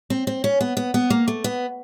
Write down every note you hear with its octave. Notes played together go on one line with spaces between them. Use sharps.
C4
C4
C#4
B3
B3
B3
A#3
A3
B3